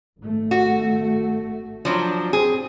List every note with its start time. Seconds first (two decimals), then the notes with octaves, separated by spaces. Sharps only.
0.19 G#1 A3
0.51 F#4
1.85 F3 F#3 D4
2.33 C4 G#4